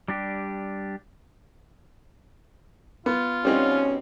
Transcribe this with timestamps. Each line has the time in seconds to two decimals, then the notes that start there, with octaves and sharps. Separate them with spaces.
0.08 G3 D4 G4
3.06 B3 F4
3.45 B2 G3 C4 C#4 D#4